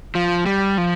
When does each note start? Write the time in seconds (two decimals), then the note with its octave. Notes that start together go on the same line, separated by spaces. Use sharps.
0.15 F3
0.46 G3
0.78 F3